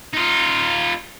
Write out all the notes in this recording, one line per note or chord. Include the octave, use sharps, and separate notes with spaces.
D#4 F4